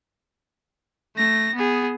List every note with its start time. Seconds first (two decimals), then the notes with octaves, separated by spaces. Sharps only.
1.16 A3 A#6
1.55 B3 G#4